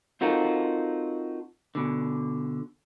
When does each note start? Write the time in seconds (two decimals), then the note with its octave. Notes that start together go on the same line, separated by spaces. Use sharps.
0.21 C4 D#4 F4 F#4 A4 A#4
1.75 B2 D3